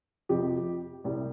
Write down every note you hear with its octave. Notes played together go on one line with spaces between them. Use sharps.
F2 C3 F3 G4
C2 C3 G3